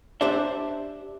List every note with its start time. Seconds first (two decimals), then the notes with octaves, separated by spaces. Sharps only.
0.21 D4 G4 C5 D5 E5